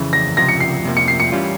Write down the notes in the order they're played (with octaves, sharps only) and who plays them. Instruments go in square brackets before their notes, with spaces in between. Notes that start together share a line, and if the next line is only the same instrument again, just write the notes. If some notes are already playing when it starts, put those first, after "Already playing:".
Already playing: [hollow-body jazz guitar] F2 C#3 E3
[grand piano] A#6
[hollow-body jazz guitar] C#2 C3 F3 [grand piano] A#6
[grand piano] C#7
C7
[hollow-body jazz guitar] F2 C3 F3 A#3
[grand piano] C#7
C7
C#7
[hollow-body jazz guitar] E3 G3 C#4 F4